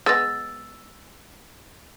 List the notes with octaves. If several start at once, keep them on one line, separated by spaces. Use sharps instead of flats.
G#3 B3 E6 A6 A#6